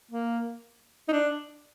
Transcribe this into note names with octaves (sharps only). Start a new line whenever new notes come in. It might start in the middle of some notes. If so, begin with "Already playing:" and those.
A#3
D#4
D4